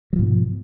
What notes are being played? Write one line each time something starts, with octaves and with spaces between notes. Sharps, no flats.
G#2 B2 F3 F#3